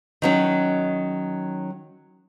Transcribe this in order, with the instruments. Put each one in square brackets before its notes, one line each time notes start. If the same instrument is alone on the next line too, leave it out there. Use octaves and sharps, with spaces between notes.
[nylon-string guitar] D#3 F#3 C#4